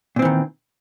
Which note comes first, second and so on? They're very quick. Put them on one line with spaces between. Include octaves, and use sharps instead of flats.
A#2 C4 E3 D#3